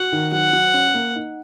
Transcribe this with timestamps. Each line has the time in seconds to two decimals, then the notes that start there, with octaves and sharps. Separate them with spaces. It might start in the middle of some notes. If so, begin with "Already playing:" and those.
Already playing: F#4 F#5
0.12 D#3
0.32 F#3 F#5
0.53 F#3
0.74 C#4
0.95 A#3
1.15 D#4